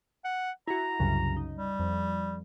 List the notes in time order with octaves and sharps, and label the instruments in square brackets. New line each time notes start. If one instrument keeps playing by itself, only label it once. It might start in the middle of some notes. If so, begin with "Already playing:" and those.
[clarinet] F#5
[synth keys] E4 F#4 [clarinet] A#5
[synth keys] C2 F#2 C#3
D#4
[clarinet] G3
[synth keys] F2